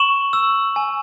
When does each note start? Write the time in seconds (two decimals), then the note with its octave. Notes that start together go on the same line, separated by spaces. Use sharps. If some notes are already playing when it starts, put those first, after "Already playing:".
Already playing: C#6 E7 F#7
0.33 E6
0.76 G#5